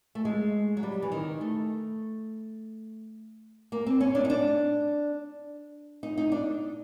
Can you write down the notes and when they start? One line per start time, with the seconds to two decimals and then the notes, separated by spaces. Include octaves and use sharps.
0.15 A3
0.25 G#3
0.77 F#3
0.83 G3
1.02 E3
1.12 D#3
1.41 A3
3.72 A#3
3.86 C4
4.01 C#4
4.15 D4
4.25 D#4
4.30 D4
6.03 D#4
6.18 D#4
6.32 D4